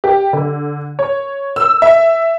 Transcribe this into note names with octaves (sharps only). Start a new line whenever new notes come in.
G4
D3
C#5
E6
E5